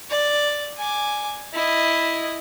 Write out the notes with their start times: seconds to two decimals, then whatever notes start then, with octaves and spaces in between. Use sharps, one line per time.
0.10 D5
0.77 G#5 D6
1.54 E4 D#5